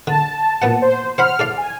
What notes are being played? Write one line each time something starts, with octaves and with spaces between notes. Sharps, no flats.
D3 A5
A#2 B3 F#5
C5
C5 F#5 B5 F6
A4 D5 F5
G#5